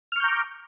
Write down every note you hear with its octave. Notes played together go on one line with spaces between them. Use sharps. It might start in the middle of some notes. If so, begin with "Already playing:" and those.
A#5 C#6 D6 F6 G6